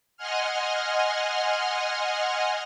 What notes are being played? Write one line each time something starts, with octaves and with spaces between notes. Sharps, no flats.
D#5 F#5 G#5 C6 F6